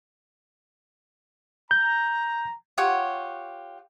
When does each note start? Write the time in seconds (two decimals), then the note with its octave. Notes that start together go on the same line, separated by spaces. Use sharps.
1.71 A#5 G6
2.78 F4 G4 C#5 F#5